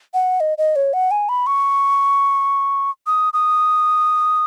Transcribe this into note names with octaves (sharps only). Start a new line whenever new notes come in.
F#5
D#5
D#5
C#5
F#5
G#5
B5
C#6
D#6
D#6